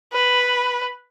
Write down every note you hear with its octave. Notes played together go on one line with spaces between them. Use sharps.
B4